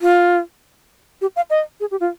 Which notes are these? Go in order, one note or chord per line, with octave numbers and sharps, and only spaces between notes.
F4
G4
F5
D#5
G#4
G4
F4